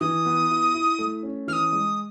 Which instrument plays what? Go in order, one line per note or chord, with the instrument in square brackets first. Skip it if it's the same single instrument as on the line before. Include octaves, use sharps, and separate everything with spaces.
[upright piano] E3 [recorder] D#6
[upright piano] B3
E4
E4
A3
C#4
[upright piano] E3 [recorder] F6
[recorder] D#6
[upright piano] G#3